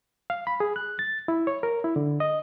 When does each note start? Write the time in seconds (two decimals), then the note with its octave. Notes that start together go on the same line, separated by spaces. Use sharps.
0.30 F5
0.47 B5
0.60 G#4
0.76 F#6
0.99 A6
1.28 E4
1.47 C#5
1.63 A#4
1.84 E4
1.96 D3
2.20 D#5